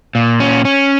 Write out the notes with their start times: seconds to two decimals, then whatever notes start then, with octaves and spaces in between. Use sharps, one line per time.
0.15 A#2
0.40 C#4
0.65 C#4